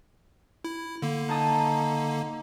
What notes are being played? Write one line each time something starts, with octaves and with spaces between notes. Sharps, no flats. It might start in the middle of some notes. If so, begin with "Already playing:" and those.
E4
D3 A#3
D#4 A5 D#6